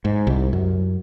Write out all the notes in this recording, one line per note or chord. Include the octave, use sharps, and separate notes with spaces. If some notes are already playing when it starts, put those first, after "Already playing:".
G#2
C2
F#2